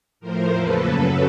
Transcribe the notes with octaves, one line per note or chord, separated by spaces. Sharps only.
A2 F3 A3 A#4 C5
E2 C#3 F3 A#3 A4 B4
F#2 C#3 F#3